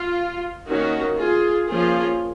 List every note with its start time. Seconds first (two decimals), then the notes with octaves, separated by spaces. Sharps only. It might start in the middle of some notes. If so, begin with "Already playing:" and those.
Already playing: F4
0.67 D#3 A#3 C#4 D#4 F#4
1.18 F4 G#4
1.68 F3 A#3 C#4 F4 G#4